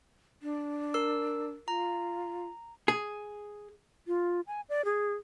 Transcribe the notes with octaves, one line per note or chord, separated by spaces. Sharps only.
D4
A#4 E6
F4 A#5
G#4
F4
G#5
D5
G#4